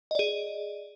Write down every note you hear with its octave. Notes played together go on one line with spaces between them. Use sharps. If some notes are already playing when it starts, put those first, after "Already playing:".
G#4 D5 D#5